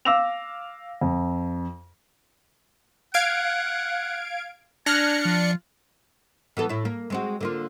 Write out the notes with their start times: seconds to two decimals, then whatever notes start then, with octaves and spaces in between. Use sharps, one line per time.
0.05 F5 D6 E6 A#6 F7
1.01 F2
3.14 F5 F#5 G#6 D7
4.86 D4 G#5 F6 F#6 A#6 C#7
5.25 F3 F4
6.57 E3 B3 A4
6.69 A2 E4
6.85 A#3
7.10 G#3 C4 F#4
7.41 D3 A#3 F4